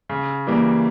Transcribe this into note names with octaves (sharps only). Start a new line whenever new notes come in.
C#3
E3 G3 A#3